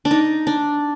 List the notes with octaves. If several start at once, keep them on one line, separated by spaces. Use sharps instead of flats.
D4
D#4
D4